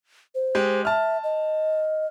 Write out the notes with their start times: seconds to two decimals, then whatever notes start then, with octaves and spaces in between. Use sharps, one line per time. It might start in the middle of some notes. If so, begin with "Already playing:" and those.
0.35 C5
0.55 G#3 G4
0.85 E5 A5 F6
1.24 D#5